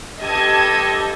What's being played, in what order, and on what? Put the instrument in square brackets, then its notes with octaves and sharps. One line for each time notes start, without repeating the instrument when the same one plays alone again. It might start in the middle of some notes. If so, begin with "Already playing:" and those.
[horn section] G2 G4 A4 [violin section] D#5 A5 G#6